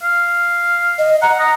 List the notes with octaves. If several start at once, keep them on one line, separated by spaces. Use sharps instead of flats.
F5
D#5
F#5 A#5
D#5